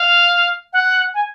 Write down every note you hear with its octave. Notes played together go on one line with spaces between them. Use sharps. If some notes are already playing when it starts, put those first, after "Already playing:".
Already playing: F5
F#5
G#5